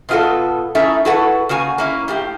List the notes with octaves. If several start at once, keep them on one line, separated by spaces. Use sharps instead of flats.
B2 B3 F4 F#4 A4
A3 C#4 D#4 E4 A#4 E5
E4 F#4 A4 B4 F#5
C#3 A#3 F#4 G#5
A#3 C#4 E4
A2 A#3 G4